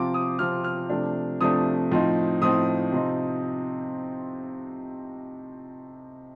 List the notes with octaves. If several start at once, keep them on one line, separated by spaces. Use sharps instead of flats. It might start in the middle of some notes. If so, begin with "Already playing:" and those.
Already playing: C3 F3 C4 F4 D6
D#6
C3 F3 C4 F4 F6
F6
C3 F3 A3 D4
C3 F3 A3 D4 D#6
A2 F3 C4 D#4
A2 F3 C4 D#4 D#6
C3 F3 C4 D#4